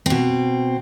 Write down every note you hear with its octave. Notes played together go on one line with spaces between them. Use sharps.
B2 C4